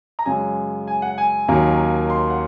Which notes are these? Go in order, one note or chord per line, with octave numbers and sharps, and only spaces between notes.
A#5
F#2 C#3 G#3 G#5
G#5
F#5
G#5
D#2 D#3 F#3 A#3 C#4
C6
F#5